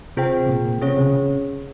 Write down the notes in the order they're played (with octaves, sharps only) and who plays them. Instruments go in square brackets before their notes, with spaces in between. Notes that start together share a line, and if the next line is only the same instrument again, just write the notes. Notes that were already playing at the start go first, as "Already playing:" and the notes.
[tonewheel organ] C3 [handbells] F4 G#4 C5 G5
[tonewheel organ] A#2
[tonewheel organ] C3 [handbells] C#4 G#4 C#5
[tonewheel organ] C#3